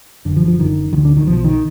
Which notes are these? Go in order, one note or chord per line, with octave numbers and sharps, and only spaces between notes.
F#1 F#2 D3
F3
F3
F#1 F#2 D3 D#3
D2 D3 D#3
D3
D#3
B1 B2 F3
D#3